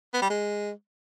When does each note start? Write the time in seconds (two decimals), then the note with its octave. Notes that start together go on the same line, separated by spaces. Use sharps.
0.14 B3
0.22 G3
0.30 G#3